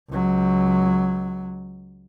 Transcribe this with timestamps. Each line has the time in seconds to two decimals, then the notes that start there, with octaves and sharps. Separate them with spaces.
0.10 C#2 F#3